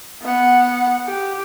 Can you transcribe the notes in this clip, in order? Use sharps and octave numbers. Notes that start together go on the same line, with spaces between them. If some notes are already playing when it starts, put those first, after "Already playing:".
B3 F#5
G4